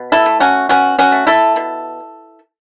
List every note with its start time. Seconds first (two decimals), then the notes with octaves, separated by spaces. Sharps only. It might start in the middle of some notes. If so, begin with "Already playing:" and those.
Already playing: B2
0.12 E4 A4
0.26 A3
0.40 C#4 F#4
0.69 B2 C#4 F#4
0.99 C#4 F#4
1.12 A3
1.27 E4 A4
1.56 B2